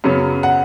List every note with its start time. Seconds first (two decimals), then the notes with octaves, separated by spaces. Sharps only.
0.04 F#2 C#3 F#3 B3
0.43 F#5